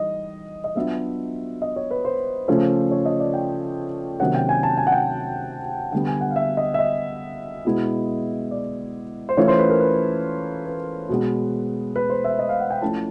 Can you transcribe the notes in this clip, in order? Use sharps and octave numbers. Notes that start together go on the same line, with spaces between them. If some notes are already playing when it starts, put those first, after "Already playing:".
Already playing: E3 G3 D#4 D#5
D#5
F#3 B3 D4 F4 E5
D#5
C#5
B4
C5
C#3 F3 A3 C#4
C#5
D#5
D5
G5
C3 D#3 F#3 A#3 C#4 F#5
G5
G#5
A5
G#5
F#5
G5
D3 G3 B3 G5
G#5
F#5
F5
E5
D#5
E5
D#5
B2 G#3 B3 E4
D5
C5
E3 A3 C#4 F4 C#5
C5
B4
A#4
B4
B4
B2 G#3 B3
B4
C5
E5
D#5
F5
F#5
G5
F3 A3 C#4 E4 A5